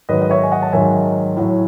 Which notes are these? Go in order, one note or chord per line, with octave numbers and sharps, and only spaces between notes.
G#2 D#3 F#3 B4 D#5
D#5
C#5 E5
G#5
D#5 F#5
A5
G#2 D#3 F#3 E5 G#5
A2 F#3